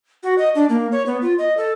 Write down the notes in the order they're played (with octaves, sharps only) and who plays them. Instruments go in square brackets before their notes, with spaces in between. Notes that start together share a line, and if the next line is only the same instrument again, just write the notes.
[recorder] F#4
D#5
D4
A#3
C#5
B3
F4
D#5
A4